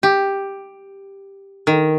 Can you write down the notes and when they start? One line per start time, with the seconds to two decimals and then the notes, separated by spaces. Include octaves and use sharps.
0.03 G4
1.67 D#3